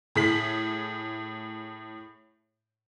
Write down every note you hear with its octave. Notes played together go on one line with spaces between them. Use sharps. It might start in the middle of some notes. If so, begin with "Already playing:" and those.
A2 G#4 B6 F#7